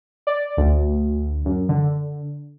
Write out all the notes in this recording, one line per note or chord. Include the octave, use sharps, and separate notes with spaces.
D5
D2
F#2
D3